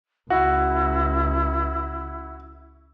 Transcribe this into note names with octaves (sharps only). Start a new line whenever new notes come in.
C#2 E4 F#4